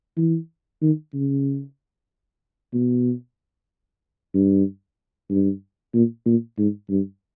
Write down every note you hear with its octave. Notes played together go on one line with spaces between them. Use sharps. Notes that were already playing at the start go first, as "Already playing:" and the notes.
E3
D#3
C#3
B2
G2
G2
A#2
A#2
G#2
G2